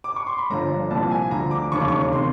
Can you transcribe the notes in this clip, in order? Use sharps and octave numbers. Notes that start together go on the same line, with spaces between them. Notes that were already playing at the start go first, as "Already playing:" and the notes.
D6
C#6
C6
B5
G1 G2 D3 F3 A#5
C2 A#2 F3 A5
G#5
D2 D3 F3 A#5
D6
E1 D#2 C#3 C#6
D6
C#6
C3 D#3 C6